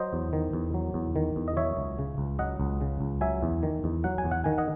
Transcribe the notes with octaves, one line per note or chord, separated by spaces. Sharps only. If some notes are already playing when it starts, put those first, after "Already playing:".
Already playing: F#3 C5 D#5
E2
D#3
E2
F#3
E2
D#3
E2
D#5
F#3 C#5 E5
C#2
C#3
C#2
F#3 D#5 F#5
C#2
C#3
C#2
F#3 E5 G#5
E2
D#3
E2
F#3 F#5
G#5
E2
F#5
D#3 G#5
D#5 F#5